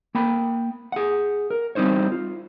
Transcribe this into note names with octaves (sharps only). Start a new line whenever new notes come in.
A#3 G5 B5
G#4 F#5
A#4
G3 C4 D#4 C5 C#5
F4